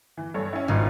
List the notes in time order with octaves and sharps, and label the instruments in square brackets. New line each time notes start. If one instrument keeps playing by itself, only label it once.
[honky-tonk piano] E3
G2 A4 C#5
C#4 E4
[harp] G#1 [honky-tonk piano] G2 B2 F4